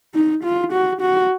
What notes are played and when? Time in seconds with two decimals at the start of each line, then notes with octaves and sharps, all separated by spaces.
0.14 D#4
0.44 F4
0.73 F#4
1.01 F#4